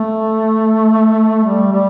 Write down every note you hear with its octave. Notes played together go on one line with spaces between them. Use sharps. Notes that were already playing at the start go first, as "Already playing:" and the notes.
Already playing: A3
G3
G3